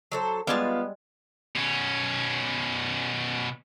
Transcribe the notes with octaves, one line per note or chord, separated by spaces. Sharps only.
F#3 A4 C5
G3 G#3 B3 F4 F5 A5
B2 C#4